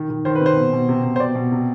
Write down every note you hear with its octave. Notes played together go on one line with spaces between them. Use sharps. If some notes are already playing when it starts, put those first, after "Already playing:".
Already playing: D#3
D#3
D#3 C5
B4
C3
C5
B2
B2
C3
C3
C5
B2 D5
B2
C3